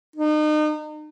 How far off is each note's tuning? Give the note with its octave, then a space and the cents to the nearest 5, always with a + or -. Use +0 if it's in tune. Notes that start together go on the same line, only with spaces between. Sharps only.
D#4 -35